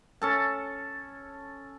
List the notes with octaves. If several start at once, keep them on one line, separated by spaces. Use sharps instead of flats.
C#4 A4 A5